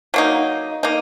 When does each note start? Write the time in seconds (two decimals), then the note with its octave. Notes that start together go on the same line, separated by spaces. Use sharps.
0.14 F#3 A#3 D#4
0.83 A#3 D#4